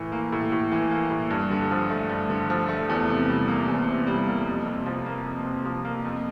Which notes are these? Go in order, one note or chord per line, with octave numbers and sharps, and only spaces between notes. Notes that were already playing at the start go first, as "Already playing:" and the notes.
Already playing: A2 E3
A#3
A2
A2
E3
A#3
A2
G2
D3
F3
A3
G2
D3
F3
A3
E2
C3
G3
A#3
E2
C3
G3
A#3
F2
C3
F3
A#3
F2
C3
F3
A#3
F2